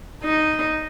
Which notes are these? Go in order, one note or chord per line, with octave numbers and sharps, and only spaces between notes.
D#4